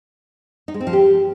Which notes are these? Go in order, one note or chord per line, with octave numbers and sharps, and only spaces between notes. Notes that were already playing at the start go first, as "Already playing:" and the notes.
D#4
G#3
C4
F3
G4